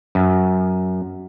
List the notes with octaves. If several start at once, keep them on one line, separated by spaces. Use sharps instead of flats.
F#2